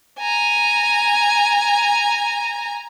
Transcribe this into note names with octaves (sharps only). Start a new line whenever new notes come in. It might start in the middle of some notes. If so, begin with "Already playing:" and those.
G#5 A#5